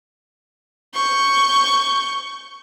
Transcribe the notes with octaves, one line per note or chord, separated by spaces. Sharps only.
C#6 G6